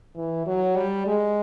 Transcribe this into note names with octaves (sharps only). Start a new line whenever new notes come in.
E3
F#3
G3
G#3